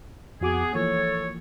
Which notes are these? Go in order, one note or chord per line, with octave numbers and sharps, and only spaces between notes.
F2 B3 F#4 G#4 D6
E3 F3 A#3 A4 C#5